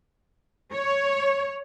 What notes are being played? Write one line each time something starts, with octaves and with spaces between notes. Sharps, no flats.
C#5